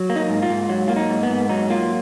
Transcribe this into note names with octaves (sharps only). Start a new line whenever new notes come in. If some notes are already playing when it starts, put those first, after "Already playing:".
Already playing: F#3
A#3
D#4
G#2
F4
G#2
F#3
A#3 F4
D#4
G#2
B3
G#2
F#3 D#4
A#3 F4